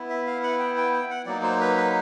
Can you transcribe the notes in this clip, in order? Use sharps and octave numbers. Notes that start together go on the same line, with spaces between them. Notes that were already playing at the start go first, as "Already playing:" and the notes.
Already playing: B3 E4
E5
F5
F#5
G5
G5
G5
F#5
F#3 A#3 D#4 D5
C5
B4
B4